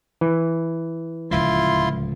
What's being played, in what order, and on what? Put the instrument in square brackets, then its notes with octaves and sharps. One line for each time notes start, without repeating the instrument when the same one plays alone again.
[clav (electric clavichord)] E3
[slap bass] D1 C#2 F3 [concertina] E4 F4 C6